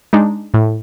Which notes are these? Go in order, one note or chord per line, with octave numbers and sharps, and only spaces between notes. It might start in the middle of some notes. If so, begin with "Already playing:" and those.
G#3 D4 D#4
A2